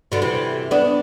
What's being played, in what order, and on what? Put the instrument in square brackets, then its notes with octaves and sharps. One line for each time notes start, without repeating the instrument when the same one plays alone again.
[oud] B2 D3
C3 E3
B3 D4